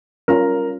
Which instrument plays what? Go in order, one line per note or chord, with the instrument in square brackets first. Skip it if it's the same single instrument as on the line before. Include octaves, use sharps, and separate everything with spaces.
[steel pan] G3 C#4 F4 [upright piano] A#4